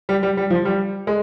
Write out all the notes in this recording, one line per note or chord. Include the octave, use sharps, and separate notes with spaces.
G3
G3
G3
F3
G3
G#3